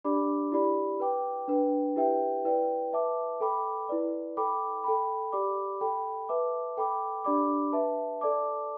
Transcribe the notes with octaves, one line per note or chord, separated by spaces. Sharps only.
D4 G4 D5 B5 D6
E4 G4 D5 B5
B4 G5 D6
D4 B4 G5
E4 G4 B4 E5 G5
E4 B4 D5 G5
B4 E5 A5 D6
A4 G5 B5 D6
E4 B4 D5
A4 G5 B5 D6
A4 G5 B5
G4 D5 B5 D6
A4 G5 B5
B4 E5 A5 D6
A4 G5 B5 D6
D4 G4 D5 B5 D6
B4 E5 A5
A4 D5 A5 D6